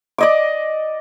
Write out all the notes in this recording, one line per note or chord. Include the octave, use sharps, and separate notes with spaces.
D5 D#5 D6